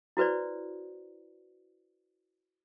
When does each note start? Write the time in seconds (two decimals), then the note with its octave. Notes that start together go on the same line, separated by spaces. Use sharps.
0.17 E4 F#4 B4 C5 D5